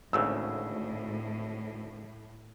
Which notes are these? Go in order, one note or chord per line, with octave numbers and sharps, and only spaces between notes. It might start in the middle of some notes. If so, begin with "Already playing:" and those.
G#1 D2 A2 C#3 E6